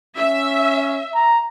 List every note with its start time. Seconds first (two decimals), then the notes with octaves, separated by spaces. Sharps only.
0.18 C#4 E5
1.15 A#5